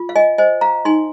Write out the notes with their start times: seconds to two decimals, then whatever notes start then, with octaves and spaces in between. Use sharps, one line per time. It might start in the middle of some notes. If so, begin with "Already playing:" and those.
Already playing: F4
0.09 F5
0.16 D#5 G#5
0.38 C5 D#5 G#5
0.61 F5 A#5
0.85 D#4 G#5 C6